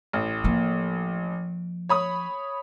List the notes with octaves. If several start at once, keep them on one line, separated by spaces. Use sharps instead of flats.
A1
F3 A#3
C#5 B5 D#6